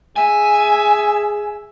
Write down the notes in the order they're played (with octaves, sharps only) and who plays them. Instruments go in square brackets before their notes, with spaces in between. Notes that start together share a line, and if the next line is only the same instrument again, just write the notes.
[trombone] G#4 [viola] E5 [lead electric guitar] G#5